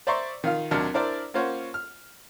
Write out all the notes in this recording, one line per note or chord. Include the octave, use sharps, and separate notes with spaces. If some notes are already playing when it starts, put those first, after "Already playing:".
C5 D5 E5 A#5 C6 C#6
D#3 F4 F5
D#2 C3 F#3 D4 F6
D4 E4 A#4 C5 D5
A#3 C#4 F4 C5 C#5 F#5
F6